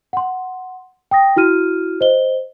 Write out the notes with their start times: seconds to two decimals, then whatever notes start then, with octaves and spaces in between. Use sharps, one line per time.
0.13 F#5 C6
1.11 G5 D#6 A#6
1.36 E4 F#4 F6 D#7
2.01 C5 D#5 G7